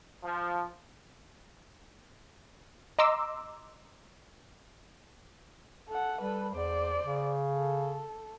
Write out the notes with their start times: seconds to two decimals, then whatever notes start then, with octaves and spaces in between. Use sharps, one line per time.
0.23 F3
2.99 D#5 A#5 C6 D6 E6
5.88 A4 F#5
6.21 G3 A4 B4
6.54 E2 C5 D5
7.03 C#3
7.54 A4